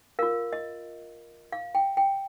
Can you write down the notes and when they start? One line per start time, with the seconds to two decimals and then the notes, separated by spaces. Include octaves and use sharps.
0.19 F4 A#4 F5
0.53 D#5
1.52 F5
1.75 G5
1.97 G5